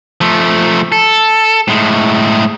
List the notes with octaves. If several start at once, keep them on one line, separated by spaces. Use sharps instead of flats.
F3 A3
A4
A2 G#3